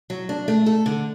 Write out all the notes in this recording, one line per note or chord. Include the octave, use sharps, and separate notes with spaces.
F#3
D4
A3
A4
D3